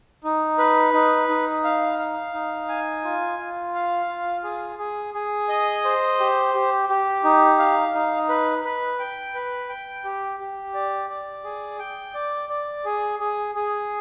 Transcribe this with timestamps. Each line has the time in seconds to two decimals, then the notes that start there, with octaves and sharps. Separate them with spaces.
0.24 D#4
0.58 B4
0.94 D#4
1.28 D#4
1.64 F5
1.99 F5
2.34 D#4
2.69 G#5
3.04 F4
3.39 F4
3.75 F5
4.09 F4
4.43 G#4
4.79 G#4
5.14 G#4
5.49 D#5
5.84 C5
6.20 G4
6.54 G4
6.89 G4
7.24 D#4
7.59 F5
7.94 D#4
8.29 B4
8.64 B4
8.99 G5
9.34 B4
9.69 G5
10.04 G4
10.40 G4
10.74 D5
11.10 D5
11.44 G#4
11.79 G5
12.14 D5
12.49 D5
12.85 G#4
13.19 G#4
13.55 G#4